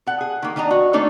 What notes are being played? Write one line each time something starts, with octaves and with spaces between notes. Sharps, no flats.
A4 F#5
G#4
D#3 A#3
D#3 D4 D#5 A#5
F#4
A3 A#3 D4 D#4 A4 C#5